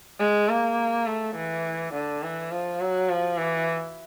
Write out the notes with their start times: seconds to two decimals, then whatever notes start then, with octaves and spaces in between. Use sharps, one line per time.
0.20 G#3
0.49 A#3
1.07 A3
1.36 E3
1.94 D3
2.23 E3
2.51 F3
2.81 F#3
3.10 F3
3.38 E3